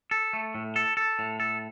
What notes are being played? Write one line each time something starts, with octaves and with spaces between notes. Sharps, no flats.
A4
A3
A2
A4
A4
A2
A4